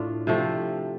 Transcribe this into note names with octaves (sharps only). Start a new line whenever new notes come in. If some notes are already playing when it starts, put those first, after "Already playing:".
Already playing: A2 A3 D4 F4
C3 F3 A3